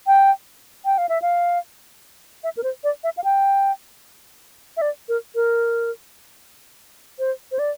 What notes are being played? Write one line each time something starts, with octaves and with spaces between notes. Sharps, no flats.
G5
G5
F5
E5
F5
E5
A#4
C5
D5
E5
F5
G5
E5
D5
A#4
A#4
C5
C5
D5